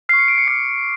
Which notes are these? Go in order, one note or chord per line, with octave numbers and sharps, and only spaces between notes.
C#6 F6 C7
C#7
D7
C#7
D6 F6 C7